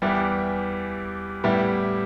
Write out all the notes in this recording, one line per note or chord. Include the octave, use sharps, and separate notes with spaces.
E2 E3 G3 E4 G4
A2 G3 B3 E4 G4